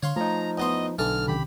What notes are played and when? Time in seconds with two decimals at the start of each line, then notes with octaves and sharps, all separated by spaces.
0.03 D3 C#5 F5 C6
0.16 F3 A3 D#4 A#5
0.58 E2 B3 D#5 C6
0.99 B1 D3 E3 A4 F6
1.28 C3 D#3 C#4 G4 B5